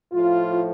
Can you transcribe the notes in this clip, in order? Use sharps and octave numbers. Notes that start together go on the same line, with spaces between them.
A2 F3 F4